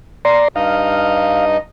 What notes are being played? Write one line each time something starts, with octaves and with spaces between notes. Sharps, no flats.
D5 A#5 C6
G2 D#4 D#5 F5